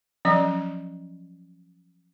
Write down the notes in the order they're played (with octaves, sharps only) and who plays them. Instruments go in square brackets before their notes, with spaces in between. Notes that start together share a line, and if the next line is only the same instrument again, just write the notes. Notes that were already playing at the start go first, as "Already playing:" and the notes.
[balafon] F3 F#3 C#4 D5